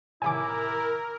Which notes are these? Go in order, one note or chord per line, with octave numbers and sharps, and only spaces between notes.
A2 C3 D#3 E4 A#4 G#5 D6